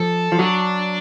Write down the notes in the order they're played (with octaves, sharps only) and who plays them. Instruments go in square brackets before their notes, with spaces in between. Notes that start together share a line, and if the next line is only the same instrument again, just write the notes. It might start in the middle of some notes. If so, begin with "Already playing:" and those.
Already playing: [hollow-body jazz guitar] F3 [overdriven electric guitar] A4
[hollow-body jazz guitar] F3
[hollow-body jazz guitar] F#3 [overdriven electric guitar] D4